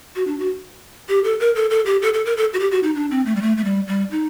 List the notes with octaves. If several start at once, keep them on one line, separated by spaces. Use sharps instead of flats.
F#4
D4
F#4
G4
A4
A#4
A4
A4
G4
A4
A4
A#4
A4
F#4
G4
F#4
D#4
D4
C4
A3
G3
A3
A3
G3
G3
D#4